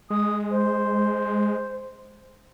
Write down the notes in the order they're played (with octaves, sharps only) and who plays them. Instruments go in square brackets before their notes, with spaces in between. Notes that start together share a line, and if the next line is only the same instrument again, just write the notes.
[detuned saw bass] G#3 [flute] D#6
[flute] C5